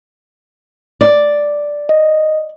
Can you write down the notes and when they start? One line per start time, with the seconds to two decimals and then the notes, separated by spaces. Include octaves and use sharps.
1.01 D5
1.89 D#5